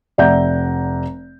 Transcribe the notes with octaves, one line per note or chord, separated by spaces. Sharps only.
F1 D5 E5 F#5 A#5 G6